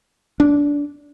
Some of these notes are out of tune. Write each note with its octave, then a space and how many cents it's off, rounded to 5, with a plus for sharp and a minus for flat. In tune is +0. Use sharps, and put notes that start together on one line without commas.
D4 -20